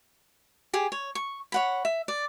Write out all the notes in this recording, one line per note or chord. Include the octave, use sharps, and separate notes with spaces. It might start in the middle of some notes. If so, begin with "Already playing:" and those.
G4 G#4
C#5
C#6
C#5 F#5 B5
E5
D5